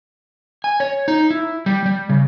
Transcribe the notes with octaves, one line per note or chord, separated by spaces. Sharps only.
G#5
C#5
D#4
E4
G3
G3
C#3